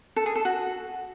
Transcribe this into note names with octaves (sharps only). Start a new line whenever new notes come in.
A4
G#4
A4
F#4